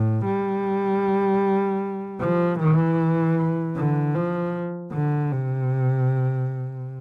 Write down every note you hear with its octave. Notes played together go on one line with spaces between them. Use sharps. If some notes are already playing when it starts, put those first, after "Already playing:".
Already playing: A2
G3
F3
E3
D3
F3
D3
C3